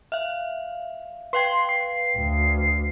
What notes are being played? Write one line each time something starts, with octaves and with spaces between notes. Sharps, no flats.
E5 F5
B4 F5 G5 C6
C7
D2